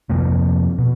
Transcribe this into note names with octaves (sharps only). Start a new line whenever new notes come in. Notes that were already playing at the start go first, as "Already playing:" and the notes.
F2 C3 F3 A#3
B2